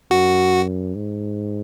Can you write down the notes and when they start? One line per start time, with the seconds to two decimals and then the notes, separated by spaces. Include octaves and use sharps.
0.11 F#2 F#4
0.95 G#2